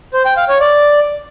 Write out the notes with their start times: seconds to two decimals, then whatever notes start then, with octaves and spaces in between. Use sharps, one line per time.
0.14 C5
0.25 G5
0.37 F5
0.48 C#5
0.60 D5